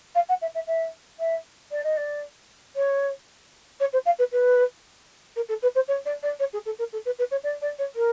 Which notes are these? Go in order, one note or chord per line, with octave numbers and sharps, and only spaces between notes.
F5
F#5
E5
E5
E5
E5
D5
D#5
D5
C#5
C#5
C5
F5
B4
B4
A#4
A4
B4
C5
C#5
D5
D5
C#5
G#4
A4
A#4
A4
B4
B4
C#5
D5
D5
C#5
A#4